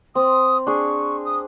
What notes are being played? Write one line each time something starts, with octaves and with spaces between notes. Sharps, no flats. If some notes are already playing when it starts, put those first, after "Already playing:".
C4 D#6
D4 G#4 C#6
D#6